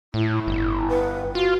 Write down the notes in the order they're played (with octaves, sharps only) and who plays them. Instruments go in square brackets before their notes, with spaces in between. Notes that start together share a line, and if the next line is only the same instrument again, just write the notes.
[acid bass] A2 [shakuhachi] E4
[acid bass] G1
[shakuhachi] B4
[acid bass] F4 [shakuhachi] F#4